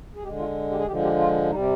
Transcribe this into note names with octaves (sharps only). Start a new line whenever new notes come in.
G#4
D3 G#3 G4
F4
G4
G#4
D3 F3 G#3 G4
G4
F4
C3 G3 D#4